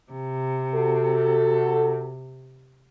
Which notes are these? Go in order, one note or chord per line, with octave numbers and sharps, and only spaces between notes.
C3
F#4 A4